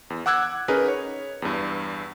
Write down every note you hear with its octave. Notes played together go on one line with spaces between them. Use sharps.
E2
F#5 D6 E6 F#6 G#6
C#4 D#4 G#4 A#4 B4
C#5
E2 G2